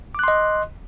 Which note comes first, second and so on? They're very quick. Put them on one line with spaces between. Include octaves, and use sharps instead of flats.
D6 F#6 C6 D#5